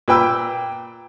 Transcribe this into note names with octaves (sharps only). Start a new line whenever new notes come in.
A#2 B4 G5 E6